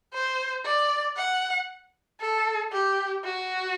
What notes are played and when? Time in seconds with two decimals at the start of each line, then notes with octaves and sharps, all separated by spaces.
0.14 C5
0.65 D5
1.17 F#5
2.21 A4
2.72 G4
3.24 F#4